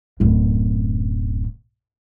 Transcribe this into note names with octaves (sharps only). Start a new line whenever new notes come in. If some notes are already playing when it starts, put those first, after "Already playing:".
D1 F#2